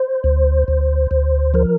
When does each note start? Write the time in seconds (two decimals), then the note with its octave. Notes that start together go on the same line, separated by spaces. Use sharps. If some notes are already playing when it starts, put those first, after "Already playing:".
Already playing: C5
0.24 D2
0.68 D2
1.11 D2
1.54 F3 A#4